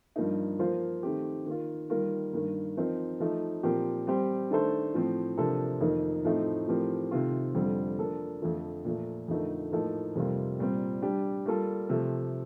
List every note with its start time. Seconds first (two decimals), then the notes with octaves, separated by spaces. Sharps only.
0.16 G2 F3 A#3 D#4
0.59 F3 A#3 F4 C5
1.03 D#3 A3 C4 G4
1.46 D#3 A#3 F4
1.90 D#3 G3 A#3 F4 A#4
2.33 G2 D#3 A#3
2.77 F3 C4 D#4 A#4
3.20 F3 A3 D#4
3.63 A#2 F3 C4 G4 A#4
4.07 G3 C4 G4 C5
4.51 D#3 A3 D4 A4 C5
4.94 A2 F3 C4
5.37 C3 F3 A#3 D4 A4
5.81 F2 D#3 A#3 D#4
6.24 A2 F3 A3 C4 D#4
6.68 A2 F3 C4 G4 A#4
7.11 C3 D#3 A3 C4 F4
7.55 F2 D3 G3 C4
7.98 F3 A#3 D4 A4
8.42 F2 D3 F3 A3
8.85 A#2 F3 A3
9.28 F2 D3 A3 D#4 A#4
9.72 A2 F3 A#3 D#4 A4
10.15 F2 C3 G3 A#3 F4
10.59 A#2 G3 C4
11.02 G3 D4 G4
11.46 G3 A#3 F4 A4
11.89 C3 F3 A3